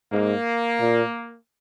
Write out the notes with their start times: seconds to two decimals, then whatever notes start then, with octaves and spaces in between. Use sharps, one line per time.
0.12 G#2 A#3
0.81 A#2